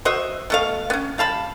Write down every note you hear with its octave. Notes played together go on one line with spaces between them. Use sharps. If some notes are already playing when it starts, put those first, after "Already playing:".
F#4 C5 D#5 E5
B2 A3 F5
B3 C#4
G3 F5 A5 B5